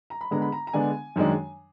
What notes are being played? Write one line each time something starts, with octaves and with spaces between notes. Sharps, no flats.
A#5
B5
D3 G#3 B3 D4 A#5
B5
A#5
A#5
D3 G#3 B3 D4 G#5
F#2 D#3 G#3 D4